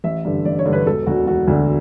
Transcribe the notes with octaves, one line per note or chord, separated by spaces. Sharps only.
A1 E5
G2 D3
A1 D5
C#5
G2 D3
B4
E1 A4
D2 D3 F#4
E1 F#4
D2 D3